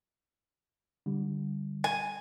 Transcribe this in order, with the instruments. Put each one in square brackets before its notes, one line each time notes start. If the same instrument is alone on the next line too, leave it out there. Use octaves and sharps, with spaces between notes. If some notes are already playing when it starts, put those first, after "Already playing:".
[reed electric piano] D3 G3
[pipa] G#5